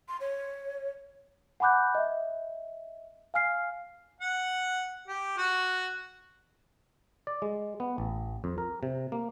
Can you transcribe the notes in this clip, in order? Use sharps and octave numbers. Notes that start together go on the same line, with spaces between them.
C6
C#5
F#5 G#5 B5 D6 F#6 G6
D#5 E5
F5 G#5 F6 C7
F#5
G4
F#4
D5
G#3
B3
A1
F2
A#4
C3
A#3